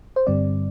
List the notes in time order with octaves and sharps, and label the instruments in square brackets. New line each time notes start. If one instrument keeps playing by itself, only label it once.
[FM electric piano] C5
G2 D3 G3 C4 D5